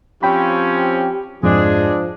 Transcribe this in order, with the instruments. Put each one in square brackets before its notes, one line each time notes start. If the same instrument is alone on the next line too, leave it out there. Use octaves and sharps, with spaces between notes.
[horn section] F3 C4 C#4 [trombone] G4 [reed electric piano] G5 B5
[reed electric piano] F2 G#2 [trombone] F3 [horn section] G#3 D4 G#4